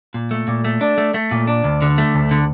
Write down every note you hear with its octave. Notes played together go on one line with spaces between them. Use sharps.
A#2
A3
A#2
A3
D4
A3
A3
A#2
D4
D2
D3
A3
D2
D3